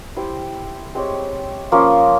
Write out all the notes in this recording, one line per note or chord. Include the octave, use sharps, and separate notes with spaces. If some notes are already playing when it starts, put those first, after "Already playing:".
E4 G4 C5 E5
G#3 C4 G4 C#5
F3 A#3 C#4